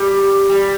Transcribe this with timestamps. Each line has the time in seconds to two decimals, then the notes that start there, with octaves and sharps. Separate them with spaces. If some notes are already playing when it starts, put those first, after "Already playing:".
Already playing: G3
0.49 G3